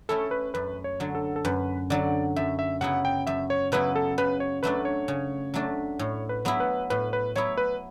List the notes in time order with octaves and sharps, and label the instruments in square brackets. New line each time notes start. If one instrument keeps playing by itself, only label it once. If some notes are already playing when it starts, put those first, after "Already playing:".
[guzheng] A3 C#4 E4 [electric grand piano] A4
[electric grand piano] B4
[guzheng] F#2 [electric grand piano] B4
[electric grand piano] C#5
[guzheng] D3 F#3
[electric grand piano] A4
A4
[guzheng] F#2 [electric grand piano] B4
[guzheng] D3 F#3 [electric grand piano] D5
[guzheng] F#2 [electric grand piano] E5
[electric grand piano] E5
[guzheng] C#3 F#3 B3 E4 [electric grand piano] F#5
[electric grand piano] G5
[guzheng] F#2 [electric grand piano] E5
[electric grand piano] C#5
[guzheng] C#3 F#3 B3 E4 [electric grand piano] B4
[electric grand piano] A4
[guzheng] C#3 [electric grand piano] B4
[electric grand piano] C#5
[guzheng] F#3 A3 D4 [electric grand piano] B4
[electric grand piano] C#5
[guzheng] C#3
F#3 A3 D4
[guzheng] A2 [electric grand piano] C#5
[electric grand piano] B4
[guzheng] F#3 B3 E4
[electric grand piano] B4
[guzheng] A2 [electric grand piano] B4
[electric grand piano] B4
[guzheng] F#3 B3 E4 [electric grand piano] C#5
[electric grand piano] B4